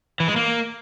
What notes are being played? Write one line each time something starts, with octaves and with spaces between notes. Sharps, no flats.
E3
G#3
A#3